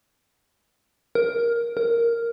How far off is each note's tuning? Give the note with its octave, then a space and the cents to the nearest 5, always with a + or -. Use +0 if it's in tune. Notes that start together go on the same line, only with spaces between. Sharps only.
A#4 +10
A#4 +0